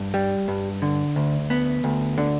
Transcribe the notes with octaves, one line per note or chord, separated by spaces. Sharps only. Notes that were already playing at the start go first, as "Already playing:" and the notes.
Already playing: G2
G3
G2
D3
D2
B3
D2
D3